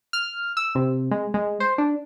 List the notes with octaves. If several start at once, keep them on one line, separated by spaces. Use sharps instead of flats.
F6
E6
C3
G#3
G#3
C5
D4